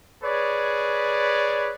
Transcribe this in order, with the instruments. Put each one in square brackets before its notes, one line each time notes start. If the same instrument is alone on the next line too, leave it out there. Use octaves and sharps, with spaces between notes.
[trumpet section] G#4 B4 C#5 D5